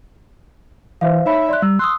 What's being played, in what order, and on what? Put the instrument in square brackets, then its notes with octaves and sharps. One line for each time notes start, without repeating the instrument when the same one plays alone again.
[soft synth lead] E3 [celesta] C5 E5 F5
[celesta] D#4 C#5 B5 [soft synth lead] E5
[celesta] D5 C6 F#6
[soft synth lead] G3 [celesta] E6
[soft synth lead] C6 [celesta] D#6 E6 F#6